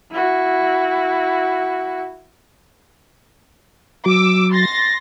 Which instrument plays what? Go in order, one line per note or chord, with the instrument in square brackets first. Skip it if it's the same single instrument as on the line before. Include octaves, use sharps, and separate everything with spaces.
[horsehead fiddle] E4 F#4
[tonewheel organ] F#3 [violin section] D6 E6
[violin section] C6 A6 A#6